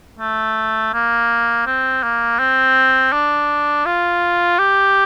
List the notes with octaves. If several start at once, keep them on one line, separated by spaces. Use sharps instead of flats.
A3
A#3
C4
A#3
C4
D4
F4
G4